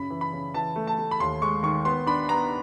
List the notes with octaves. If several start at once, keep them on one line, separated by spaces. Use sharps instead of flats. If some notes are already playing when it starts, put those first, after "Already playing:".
Already playing: F#2 C#3 B5
E3
B5
C#3
E3 A5
A3
A5
A3
B5
D#2 C6
G#3 C#6
D#3 C#6
B3 C6
D4 B5
B3 A#5